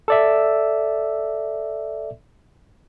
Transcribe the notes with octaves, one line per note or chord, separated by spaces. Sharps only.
A4 D5 E5